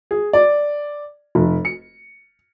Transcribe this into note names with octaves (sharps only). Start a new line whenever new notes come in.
G#4
D5
F1
C#7